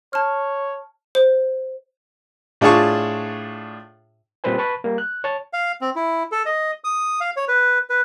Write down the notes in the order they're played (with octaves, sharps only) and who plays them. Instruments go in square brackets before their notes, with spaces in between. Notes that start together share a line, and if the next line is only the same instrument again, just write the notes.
[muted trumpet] C#5 [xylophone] A5 F6
[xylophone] C5
[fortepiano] A2 D4 F4 G#4 A5 C#6
[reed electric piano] A#2 G3 C4 B4 C5 G#5
B4 A5 B5 C#6
G3 A#3
F#6
C#5 A5
[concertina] F5
C4
E4
A4
D#5
D#6
F5
C#5
B4
B4